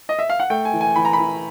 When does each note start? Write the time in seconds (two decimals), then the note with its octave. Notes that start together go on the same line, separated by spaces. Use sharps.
0.09 D#5
0.19 E5
0.29 F5
0.40 F#5
0.50 A3 G5
0.65 G#5
0.73 E3
0.81 G#5
0.96 E3 B5
1.05 A#5
1.13 B5
1.19 E3